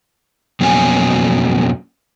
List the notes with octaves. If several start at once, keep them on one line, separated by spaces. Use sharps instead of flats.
F2 B2 F#3 A#3 C#4 G#5